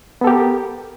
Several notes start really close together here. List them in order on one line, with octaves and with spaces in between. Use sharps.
B3 A4 G4 A#4